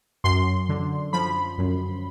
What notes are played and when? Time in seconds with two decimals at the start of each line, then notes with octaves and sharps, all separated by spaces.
0.24 F#2 C6
0.69 D3
1.13 F3 B5
1.58 F#2